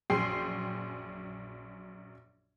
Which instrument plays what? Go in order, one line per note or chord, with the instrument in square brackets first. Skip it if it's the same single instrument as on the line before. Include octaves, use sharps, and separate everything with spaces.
[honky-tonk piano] A#1 F#2 G#4 G5 C6 C7